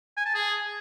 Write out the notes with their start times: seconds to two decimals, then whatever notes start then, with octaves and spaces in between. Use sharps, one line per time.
0.17 G#5
0.26 A5
0.35 G#4